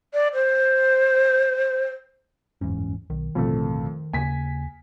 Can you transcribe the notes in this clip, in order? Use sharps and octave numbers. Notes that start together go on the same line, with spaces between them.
D5
C5
F#1 E2 G#2 C#4
B1 D#3
A1 F2 B2 D3 A3
D#2 C#3 A#3 G#5 B6